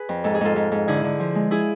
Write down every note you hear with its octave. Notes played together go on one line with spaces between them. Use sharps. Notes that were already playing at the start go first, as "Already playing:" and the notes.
Already playing: G#4 B4
F2
G#2 A4
G#4
G#2 F4 A4
G#2
G#2
D3 E4 G#4
D3
F3
G#3
E4 G#4